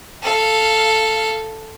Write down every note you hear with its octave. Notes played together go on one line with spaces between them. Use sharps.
A4 F5